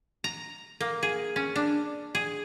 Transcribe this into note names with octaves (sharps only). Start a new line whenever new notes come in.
A#5
A#3
G#4
C#4
D4
G#4